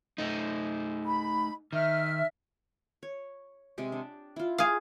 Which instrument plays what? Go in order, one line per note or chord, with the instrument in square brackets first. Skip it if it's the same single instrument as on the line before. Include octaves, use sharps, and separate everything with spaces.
[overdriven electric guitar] A3 D#4
[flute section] B5
[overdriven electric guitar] D#3 [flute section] E5 F6
[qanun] C#5
C3 G#3 G4
D4
E4 F4
[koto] G#4 F5